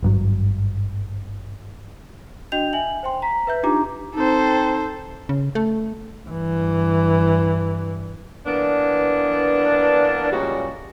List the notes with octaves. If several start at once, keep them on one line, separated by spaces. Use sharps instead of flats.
G#1 G2 F#3
D4 F#4 D#5 G5 G6 F7
E5 G#5 F#7
C5 G5 C6
A#5 B6
B4 E5 G6
D4 D#4 F4 G4 A#5 D6
C4 D#4 A4 C5
C#3
A3
G2 E3
E3 A#3 B3 D4
A#2 C#3 G3 G#3 F#4